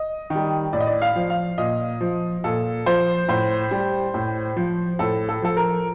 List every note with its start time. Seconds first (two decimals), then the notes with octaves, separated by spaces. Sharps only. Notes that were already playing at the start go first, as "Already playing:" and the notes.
Already playing: D#5
0.30 D#3 G3
0.73 A2 D5
0.80 D#5
0.87 D5
1.02 F5
1.16 F3
1.30 F5
1.58 A#2 D#5
2.01 F3
2.44 A#2 A4
2.86 F3 C5
3.29 A2 C5
3.71 G3
4.14 A2
4.56 F3
4.99 A2 A4
5.29 A4
5.42 F3 A4
5.57 A#4